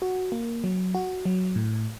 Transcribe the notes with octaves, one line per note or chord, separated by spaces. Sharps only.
F#4
A#3
F#3
F#4
F#3
A2